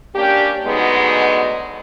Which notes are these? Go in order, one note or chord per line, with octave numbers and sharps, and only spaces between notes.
A#3 C#4 D4 G4
D2 G#2 F#3 G#3 B3 D#4